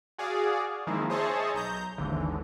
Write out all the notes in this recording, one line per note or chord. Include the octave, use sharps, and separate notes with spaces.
F#4 G#4 D5 F5
D#3 F3 G#3 A#3 C4 E4
G#4 C5 C#5 D#5 E5 A5
B1 A#5 G6
G#1 D#2 D3 E3